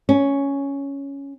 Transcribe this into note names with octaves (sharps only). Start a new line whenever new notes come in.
C#4